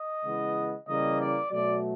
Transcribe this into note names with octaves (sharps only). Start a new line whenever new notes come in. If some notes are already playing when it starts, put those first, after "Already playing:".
Already playing: D#5
C#3 E3 G#3 B3
C#3 E3 G3 A#3 D#5
D5
B2 F#3 A3 D5